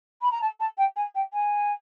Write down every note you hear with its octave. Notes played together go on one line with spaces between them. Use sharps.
B5
A#5
A5
A5
G5
G#5
G5
G#5